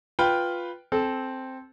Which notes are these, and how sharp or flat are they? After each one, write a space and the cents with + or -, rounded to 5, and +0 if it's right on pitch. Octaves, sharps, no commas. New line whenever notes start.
F4 +5 B4 +0 G5 +0
C4 +0 A4 -20